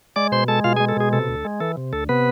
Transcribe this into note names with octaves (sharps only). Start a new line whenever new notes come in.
G#3 D5 D6
B2 C5 C6
G#3 A4 A5
B2 F4 F5
G#4 G#5
G#3
A4
B2 G#4
C3 A4
D2
G#3
E3 A4
C3
D2 A4
C3 B3 B4